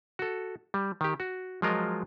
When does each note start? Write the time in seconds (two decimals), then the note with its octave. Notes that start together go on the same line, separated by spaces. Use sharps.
0.19 F#4 A4
0.74 G3
1.01 D#3 G4
1.20 F#4
1.62 F3 F#3 G#3 F4 A#4 D#5